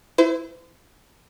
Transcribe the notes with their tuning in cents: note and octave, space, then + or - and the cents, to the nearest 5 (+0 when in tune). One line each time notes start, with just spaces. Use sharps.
E4 +0 C5 -40